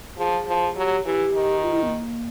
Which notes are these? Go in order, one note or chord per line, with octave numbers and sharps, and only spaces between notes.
F3 G#4
F3
F#3 G4
E3 G4
D#3
F4
E4
B3
A#3